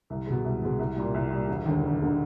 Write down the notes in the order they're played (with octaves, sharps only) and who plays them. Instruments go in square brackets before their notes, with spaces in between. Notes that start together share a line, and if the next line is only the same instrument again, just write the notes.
[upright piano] C2
B2 G#3
C2
B2 G#3
C2
A#2 G3
C2
A#2 G3
E1
D#2 D3
E1
D3